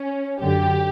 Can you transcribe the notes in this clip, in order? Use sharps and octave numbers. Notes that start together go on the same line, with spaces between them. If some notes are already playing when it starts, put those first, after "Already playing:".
Already playing: C#4
F#2 D3 G4